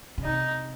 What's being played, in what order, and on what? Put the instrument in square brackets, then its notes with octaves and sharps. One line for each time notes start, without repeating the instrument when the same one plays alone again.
[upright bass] C#3
[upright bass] C3 [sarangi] D#4